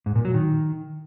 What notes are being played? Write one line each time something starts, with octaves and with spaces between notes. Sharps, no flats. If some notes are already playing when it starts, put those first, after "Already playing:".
G#2
A#2
F#3
D#3